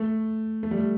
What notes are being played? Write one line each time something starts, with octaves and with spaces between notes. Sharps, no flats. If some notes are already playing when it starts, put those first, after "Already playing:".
Already playing: A3
A3
G3
A3